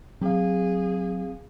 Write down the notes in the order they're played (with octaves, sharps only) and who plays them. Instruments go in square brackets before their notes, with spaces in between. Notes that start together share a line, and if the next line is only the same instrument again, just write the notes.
[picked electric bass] F#3 [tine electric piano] C4 F5 [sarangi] G#4